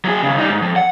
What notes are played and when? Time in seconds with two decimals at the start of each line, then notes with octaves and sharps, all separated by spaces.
0.05 F#3 G#4
0.23 D#2 C#3
0.38 G3 D#4
0.50 G#2
0.62 F2
0.76 F#5